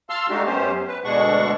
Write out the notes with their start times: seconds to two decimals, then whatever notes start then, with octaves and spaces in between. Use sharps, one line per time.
0.10 F5 A5 C6 E6 F6
0.29 G#3 A3 D4 D#4 F#4 G4
0.46 F#2 B3 C#4 G4 C5
0.88 B4
1.04 D2 B2 G#3 D4 F#5 C#6